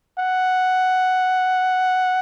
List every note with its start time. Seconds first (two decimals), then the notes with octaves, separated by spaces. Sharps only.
0.19 F#5